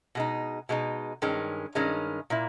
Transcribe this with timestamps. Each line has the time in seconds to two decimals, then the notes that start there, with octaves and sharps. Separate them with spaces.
0.15 B2 G#3 D#4
0.69 B2 G#3 D#4
1.22 G2 D#3 G#3 C#4
1.75 G2 D#3 G#3 C#4
2.30 A#2 A#3 E4